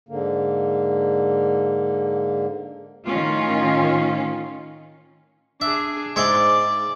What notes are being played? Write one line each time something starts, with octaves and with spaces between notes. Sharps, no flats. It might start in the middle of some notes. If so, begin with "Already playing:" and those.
G#2 D3 A#3
A2 D#3 C#4 F4
D4 G#4 E5
G#2 G#3 D5 E5 C6